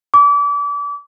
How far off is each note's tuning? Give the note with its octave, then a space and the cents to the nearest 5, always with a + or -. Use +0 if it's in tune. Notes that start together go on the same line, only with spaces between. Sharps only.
D6 -30